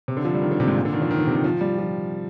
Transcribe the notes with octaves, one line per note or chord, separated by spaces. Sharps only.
C3
D3
F3
G3
D#3
D3
C3
G#2
A#2
D3
D#3
F3
D#3
D3
C3
D#3
F3
G3
F3